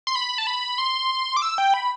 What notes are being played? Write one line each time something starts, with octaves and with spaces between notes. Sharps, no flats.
C6
B5
A5
B5
C6
D6
E6
G5
B5